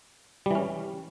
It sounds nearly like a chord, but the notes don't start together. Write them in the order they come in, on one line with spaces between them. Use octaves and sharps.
G3 E3 C#4